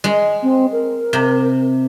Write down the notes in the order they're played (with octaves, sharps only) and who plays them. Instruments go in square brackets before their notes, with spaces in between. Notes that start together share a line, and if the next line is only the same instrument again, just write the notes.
[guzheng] G#3
[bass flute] C4
A#4
[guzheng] C3